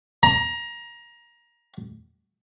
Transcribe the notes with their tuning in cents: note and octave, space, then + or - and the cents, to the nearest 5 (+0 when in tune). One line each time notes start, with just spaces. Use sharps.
A#5 +25